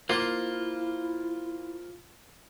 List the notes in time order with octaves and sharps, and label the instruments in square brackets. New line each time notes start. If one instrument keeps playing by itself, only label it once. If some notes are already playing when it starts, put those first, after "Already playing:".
[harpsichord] A#3 [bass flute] E4 [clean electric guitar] F4 C5